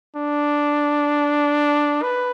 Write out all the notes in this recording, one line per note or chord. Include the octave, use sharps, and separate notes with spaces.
D4
B4